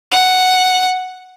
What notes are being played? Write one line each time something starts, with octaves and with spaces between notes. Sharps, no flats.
F#5